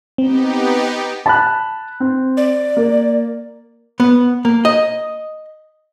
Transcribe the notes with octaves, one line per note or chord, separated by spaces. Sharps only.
B3 C4 D#4 G4
A5 B5 F#6
C4
D5
A#3
B3
A#3
D#5